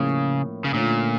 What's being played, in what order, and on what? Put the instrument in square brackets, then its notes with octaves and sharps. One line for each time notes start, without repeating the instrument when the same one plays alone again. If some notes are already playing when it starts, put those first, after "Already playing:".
Already playing: [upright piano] A2 F3 A#3 C#4 E4 [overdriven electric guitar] C#3
[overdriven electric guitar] C#3
[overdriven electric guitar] A#2 [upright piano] D3 A3 C#4 F4